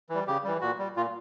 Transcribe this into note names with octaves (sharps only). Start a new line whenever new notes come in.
E3 G3
C#3 G4
E3 G3
A#2 F#4
G3
A#2 F4